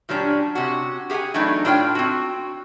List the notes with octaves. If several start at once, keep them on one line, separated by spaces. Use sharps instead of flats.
A#2 F#3 G3 C#4 D4
C3 C#4 F#4
G4 G#4 F5 F#5 G#5
E3 F#3 A3 B3 D4 D#4
A2 D4 F4 C#5 D5 G5
C4 F#4